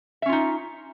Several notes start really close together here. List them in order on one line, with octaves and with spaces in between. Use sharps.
E5 C#4 F4 D#4